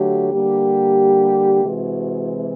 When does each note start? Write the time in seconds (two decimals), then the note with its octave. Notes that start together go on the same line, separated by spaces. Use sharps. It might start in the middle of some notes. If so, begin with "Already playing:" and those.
Already playing: D3 F#3 A3 G4
0.32 D3 G3 A#3 G4
1.64 C3 E3 G#3 F#4